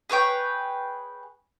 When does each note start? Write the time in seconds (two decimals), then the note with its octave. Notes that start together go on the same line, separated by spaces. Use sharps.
0.10 G#4 B4 C#5 G5